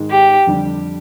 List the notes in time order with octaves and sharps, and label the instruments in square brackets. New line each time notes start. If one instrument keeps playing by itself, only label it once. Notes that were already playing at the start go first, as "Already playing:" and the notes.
Already playing: [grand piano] G#2 D#3 G#3
[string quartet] G4
[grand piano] F2 D3 G3 D4